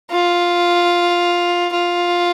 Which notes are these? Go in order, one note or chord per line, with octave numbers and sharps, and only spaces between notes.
F4
F4